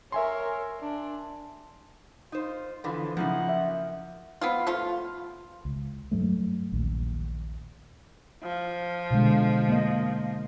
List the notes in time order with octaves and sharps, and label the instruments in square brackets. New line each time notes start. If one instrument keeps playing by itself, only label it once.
[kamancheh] A#4 C#5 [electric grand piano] E5 G#5 C6
[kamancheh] D4
[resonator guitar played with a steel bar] D#4 C5 [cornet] F4
[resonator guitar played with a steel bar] D3 E3 F3 [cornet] C5
[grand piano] C#3 F3 [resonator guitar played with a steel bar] A#3 D#4 E4 [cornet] F#5
[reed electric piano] E5
[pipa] B3 C4 F4
F3 A3 F4
[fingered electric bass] C#2
G2 F#3 A3
A#1 D#2
[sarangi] F3
[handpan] B2 D3 G#3
A#3 D#5